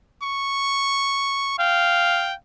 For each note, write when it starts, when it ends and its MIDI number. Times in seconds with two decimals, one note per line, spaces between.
0.23 1.56 85
1.59 2.34 77
1.59 2.34 79